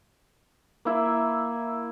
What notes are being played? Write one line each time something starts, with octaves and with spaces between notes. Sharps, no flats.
A#3 E4 E5